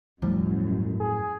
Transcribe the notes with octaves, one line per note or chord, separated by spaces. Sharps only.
E1 F#2 A2 F3 G3
G#4